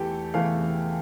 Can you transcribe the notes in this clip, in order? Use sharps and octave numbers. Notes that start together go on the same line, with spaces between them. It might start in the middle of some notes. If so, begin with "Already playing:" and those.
Already playing: E2 E3 A3 G4 A4
E2 E3 A3 F5